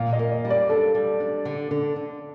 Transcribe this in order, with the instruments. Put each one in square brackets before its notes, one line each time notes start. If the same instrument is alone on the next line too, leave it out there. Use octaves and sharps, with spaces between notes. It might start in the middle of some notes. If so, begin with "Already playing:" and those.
Already playing: [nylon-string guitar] A#2 [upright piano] F5
[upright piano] D#5
[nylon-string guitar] A#3
[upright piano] D#5
[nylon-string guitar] G3
[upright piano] D5
[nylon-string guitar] D4 [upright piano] A4
[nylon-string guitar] G3
D4
D3
D3
D3